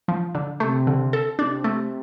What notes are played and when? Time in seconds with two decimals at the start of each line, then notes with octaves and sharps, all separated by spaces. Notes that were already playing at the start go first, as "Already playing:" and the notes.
0.08 F3
0.35 D3
0.60 C3 A3
0.87 D3
1.13 A4
1.39 C3 D4
1.64 A3